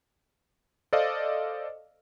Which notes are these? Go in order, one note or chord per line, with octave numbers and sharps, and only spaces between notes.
A4 C5 D5 D#5 F5